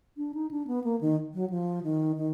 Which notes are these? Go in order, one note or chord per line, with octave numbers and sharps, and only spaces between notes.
D4
D#4
D4
B3
A#3
D#3
F#3
F3
D#3
D#3